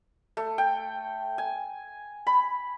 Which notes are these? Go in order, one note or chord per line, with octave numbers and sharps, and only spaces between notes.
A3
G5
G#5
B5